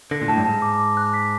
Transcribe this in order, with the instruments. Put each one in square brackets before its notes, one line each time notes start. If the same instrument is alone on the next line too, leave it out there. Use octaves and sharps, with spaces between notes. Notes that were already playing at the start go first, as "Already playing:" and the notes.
[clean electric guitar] D3 [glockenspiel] A#6
[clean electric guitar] A#2
[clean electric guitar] A2 [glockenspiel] A5
[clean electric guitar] G2
[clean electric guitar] G#2 [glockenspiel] A5
[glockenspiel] D6
D6
F#6
B6